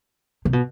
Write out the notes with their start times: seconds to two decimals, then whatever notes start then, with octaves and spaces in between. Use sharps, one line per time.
0.45 C3
0.53 B2